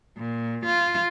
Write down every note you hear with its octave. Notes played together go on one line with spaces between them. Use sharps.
A#2
F4